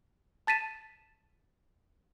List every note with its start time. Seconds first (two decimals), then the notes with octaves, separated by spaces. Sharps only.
0.47 A5 A6 B6 D#7 E7